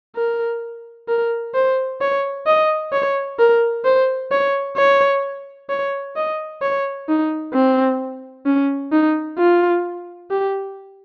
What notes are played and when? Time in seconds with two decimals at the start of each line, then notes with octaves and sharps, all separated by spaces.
0.16 A#4
1.08 A#4
1.54 C5
2.01 C#5
2.47 D#5
2.93 C#5
3.39 A#4
3.85 C5
4.31 C#5
4.77 C#5
5.70 C#5
6.16 D#5
6.62 C#5
7.09 D#4
7.54 C4
8.46 C#4
8.92 D#4
9.39 F4
10.31 G4